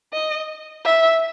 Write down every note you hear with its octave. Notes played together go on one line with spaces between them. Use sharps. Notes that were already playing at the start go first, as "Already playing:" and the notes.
D#5
E5